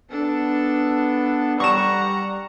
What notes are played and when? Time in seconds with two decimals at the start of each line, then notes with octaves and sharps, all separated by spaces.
0.11 B3 D4 A4
1.60 G3 F#5 A#5 C#6 E7